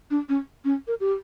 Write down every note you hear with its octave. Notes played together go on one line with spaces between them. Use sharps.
D4
C#4
C#4
A#4
G4